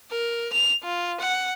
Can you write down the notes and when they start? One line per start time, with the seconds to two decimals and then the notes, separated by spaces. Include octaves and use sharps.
0.10 A#4
0.53 F7
0.83 F4
1.20 F#5